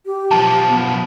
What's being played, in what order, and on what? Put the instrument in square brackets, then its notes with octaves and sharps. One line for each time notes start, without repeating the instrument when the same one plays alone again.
[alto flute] G4
[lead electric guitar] B1 F3 [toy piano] A5
[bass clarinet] B3